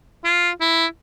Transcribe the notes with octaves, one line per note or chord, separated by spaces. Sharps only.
F4
E4